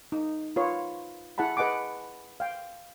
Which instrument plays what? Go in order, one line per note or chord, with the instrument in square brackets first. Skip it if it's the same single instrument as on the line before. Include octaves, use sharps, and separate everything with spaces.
[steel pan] D#4
F4 B4 C#5
E4 G#4 F#5 A5 B5
G#4 B4 D#5 F#5 G#5 D6
F5 G5